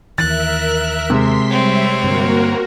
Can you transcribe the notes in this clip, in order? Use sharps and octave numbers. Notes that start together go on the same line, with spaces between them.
D#2 E3 A#4 E5 F#6 A6
C3 G#3 C6 B6
G3 C4 C#5 E5
G2 D3 A#3 F#4 A#4